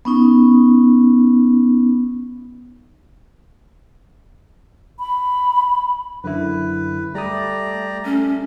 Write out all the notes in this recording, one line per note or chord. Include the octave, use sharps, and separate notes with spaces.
B3 C#4 D#4
B5
F#2 D3 E4 B4
G3 A3 G4 D5 A#5 D#6
A3 C#4